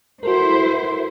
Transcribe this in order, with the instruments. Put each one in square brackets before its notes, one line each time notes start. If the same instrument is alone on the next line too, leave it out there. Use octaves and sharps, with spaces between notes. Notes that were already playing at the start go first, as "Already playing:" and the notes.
[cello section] E4 C5 [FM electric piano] F#4 A4 A#4